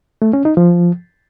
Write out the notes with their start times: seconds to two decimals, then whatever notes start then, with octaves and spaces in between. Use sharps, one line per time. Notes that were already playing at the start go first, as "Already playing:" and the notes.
0.22 A3
0.33 C#4
0.45 D#4
0.57 F3